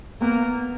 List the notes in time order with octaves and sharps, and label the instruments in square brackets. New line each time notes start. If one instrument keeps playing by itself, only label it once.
[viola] A#3 [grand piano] B3